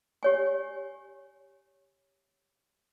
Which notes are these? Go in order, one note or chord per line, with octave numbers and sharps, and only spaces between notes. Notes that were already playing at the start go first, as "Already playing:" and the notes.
G4 C#5 G#5